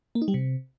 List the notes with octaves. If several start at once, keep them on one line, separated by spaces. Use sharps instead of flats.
A#3
D#4
G3
C3